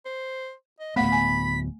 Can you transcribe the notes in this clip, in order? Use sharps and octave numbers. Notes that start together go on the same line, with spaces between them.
C5
D#5
D1 A3 B3 F5 F#5 B5 B6
G#5